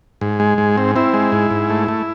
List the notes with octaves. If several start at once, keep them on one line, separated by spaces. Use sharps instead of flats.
G#2
G#3
G#2
C4
C4 E4
G#3
G#2
G#2
A3
A3